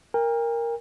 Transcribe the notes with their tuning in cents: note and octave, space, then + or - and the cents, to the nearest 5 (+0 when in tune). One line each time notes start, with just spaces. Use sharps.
A#4 +0 G5 +45